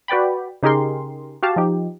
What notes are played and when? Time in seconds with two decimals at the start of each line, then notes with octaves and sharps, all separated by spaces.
0.08 F#4 B4 D5 G5 B5
0.63 C#3 D#4 G4 G#4 A#4 C6
1.43 F#4 G4 F5 A5
1.56 F3 D#4 G4